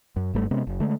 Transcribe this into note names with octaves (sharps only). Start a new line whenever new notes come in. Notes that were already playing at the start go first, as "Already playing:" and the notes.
F#2
F#1 G2 G3 A3
C3 G#3 B3 C#4
F#1
D3 G#3 A3